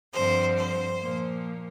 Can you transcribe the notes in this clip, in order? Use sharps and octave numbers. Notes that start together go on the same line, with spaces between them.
G2 D3 F3 C4 C5
C5
A#2 F3 A#3